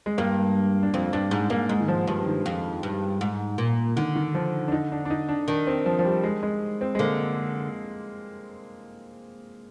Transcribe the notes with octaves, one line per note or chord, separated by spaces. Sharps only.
G#3
G2 A#3
D4
F2 C4
G2 D4
G#2
G#2 A#3
G#2 G#3
D#3
F3
G2 F3
D#3
F2
G2
G#2
A#2
D3 D#3
D#3
F3
D4
D#4
D4
D4
D#4
D4
D#3 D4
C4
F3
F3
G3
G#3
G#3
C4
G#3
D3 A#3